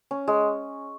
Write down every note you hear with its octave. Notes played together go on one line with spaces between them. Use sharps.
C#4
G#3